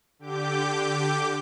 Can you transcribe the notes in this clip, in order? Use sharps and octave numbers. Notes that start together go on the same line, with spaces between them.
D3 G4 D6 G6